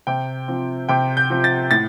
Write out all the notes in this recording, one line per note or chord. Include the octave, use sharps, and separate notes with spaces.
C3 G5
F3 C4
C3 G5
G6
F3 C4
A6
A2 A6